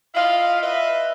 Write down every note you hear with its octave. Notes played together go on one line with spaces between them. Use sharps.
E4 F4 D#5 F5
B4 D#5 E5